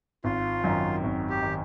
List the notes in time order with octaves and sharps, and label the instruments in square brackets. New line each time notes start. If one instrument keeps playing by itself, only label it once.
[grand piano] G#1 [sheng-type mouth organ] F4
[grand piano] F#2 D#3
G#1
[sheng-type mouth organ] G4
[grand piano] D#3